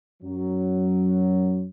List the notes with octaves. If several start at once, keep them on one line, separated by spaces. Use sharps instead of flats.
F#2 F#3